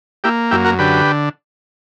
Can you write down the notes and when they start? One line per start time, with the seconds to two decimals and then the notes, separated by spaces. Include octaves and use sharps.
0.24 A#3 E4 G4
0.51 F#2 E4 G4
0.65 F#4 A#4
0.79 D3 G4 B4